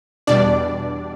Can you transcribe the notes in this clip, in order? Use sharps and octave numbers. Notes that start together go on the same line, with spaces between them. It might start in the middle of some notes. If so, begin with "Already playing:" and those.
E2 B2 G3 D4 D5